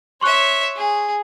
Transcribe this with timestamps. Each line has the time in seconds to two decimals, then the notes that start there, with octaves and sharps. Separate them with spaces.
0.21 C#5 E5 C6 C#6 F#6
0.76 G#4